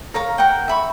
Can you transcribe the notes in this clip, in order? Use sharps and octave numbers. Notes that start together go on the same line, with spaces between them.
A#4 C#5 F5 A#5
A#4 F#5 G5
E5 B5 C#6